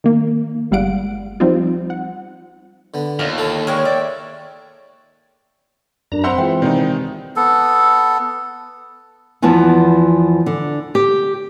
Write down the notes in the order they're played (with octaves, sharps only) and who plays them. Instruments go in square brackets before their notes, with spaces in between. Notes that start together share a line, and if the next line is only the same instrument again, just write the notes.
[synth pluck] D#3 A#3
G1 G3 G#3 F5 F#5 D7
F3 G3 C4 D#4 F4
F#5
[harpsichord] D3 B3
[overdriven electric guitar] D#2 [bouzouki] A3 D4 F4
[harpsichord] A4 C#5
[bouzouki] G#3 C#4 D4 [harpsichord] A#4 [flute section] C#5 G5 C#6
[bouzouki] D5 E5
[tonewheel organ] F#2 A#5 [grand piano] D4 A#4
[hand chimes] C4 C5 [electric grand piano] E5 F#5 C6 [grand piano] B5 E6 G6
[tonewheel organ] E3 [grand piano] G#3 F4 G#4 [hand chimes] G5
[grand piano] C3 C5 D5 [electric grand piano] D#3 G#3 D#4
[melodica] B3 A4
[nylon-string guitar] E2 E3 F3 B3 A5
D3
G4